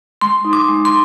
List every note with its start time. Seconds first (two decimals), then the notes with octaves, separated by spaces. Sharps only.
0.21 G#3 C6
0.45 D#4
0.53 D6
0.68 G#3
0.85 C6